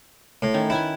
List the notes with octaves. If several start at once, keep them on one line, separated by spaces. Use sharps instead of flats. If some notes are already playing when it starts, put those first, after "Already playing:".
A2
D#3 C#4
E4 B4 G5 G#5